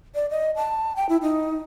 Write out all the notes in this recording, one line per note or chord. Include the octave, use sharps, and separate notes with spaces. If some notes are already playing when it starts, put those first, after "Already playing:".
D5
D#5
A5
G5
E4
D#4